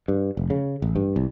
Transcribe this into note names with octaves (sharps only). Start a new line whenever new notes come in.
G2
F1
C#3
A1
G2
C2